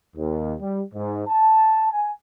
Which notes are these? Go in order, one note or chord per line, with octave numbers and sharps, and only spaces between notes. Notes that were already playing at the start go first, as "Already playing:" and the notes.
D#2
G3
G#2
A5
G#5